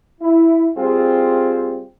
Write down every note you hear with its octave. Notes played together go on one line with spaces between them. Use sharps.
E4
G3 C4 F4 G4 G#4